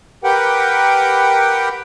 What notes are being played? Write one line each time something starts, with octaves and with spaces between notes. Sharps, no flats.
G4 A#4 B4 F#5 G5